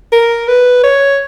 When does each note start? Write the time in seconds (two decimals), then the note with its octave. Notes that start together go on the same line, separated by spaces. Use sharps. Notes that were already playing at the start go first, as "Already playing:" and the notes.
0.12 A#4
0.48 B4
0.83 C#5